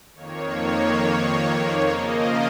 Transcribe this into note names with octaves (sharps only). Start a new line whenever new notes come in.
F2 D#3 A#3 C#5
C#3 F3 A#3 D#5
F5